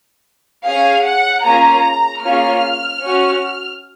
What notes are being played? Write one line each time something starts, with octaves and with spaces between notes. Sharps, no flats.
C#4 G#4 F5
F#5
A#3 C#4 F4 G#4 A#5
A#3 C#4 F4 G#4 F6
C#4 F#4